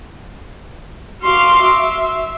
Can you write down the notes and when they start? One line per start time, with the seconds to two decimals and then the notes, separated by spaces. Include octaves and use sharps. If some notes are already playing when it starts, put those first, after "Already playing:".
1.22 F#4 F5 C6 D6
1.62 E5